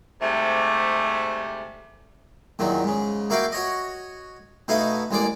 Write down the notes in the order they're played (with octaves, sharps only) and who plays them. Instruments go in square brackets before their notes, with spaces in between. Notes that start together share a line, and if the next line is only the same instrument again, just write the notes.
[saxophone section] G#2 C3 G3 A3
[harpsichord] E2 A#2 D#3 F#3
G#2 C#3
A#3 E4 F#4 F5 G5
F#4 C#5 D#5
B2 A3 D#4 E4 F5 D#6
A1 G#3 A#3 D5